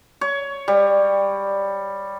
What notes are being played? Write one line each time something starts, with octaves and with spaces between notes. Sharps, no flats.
C#5
G3